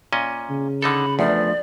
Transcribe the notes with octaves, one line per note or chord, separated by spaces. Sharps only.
A#2 C#4 D#5
C#3
D3 D#4 A4 B5
E2 F3 A3 D4 D5